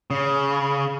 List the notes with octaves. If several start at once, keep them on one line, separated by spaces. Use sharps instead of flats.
C#3